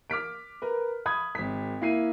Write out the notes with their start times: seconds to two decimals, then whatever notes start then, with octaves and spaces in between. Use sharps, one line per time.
0.10 D6 F6 B6 D7
0.62 A#4 B4
1.06 B5 D#6 G#6
1.35 G#1 B6
1.81 A#3 E4 C7 D#7